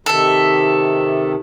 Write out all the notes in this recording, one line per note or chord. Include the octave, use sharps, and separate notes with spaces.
C3 D#3 A4 E5